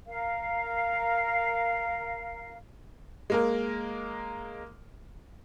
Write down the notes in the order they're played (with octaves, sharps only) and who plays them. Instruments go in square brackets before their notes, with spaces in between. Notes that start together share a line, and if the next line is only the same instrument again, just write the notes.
[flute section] A#4 F5
[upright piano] G#3 A#3 A#4